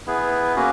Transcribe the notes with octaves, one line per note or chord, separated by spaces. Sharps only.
B3 E4 G#4 B4
A#3 C#4 F#4 B4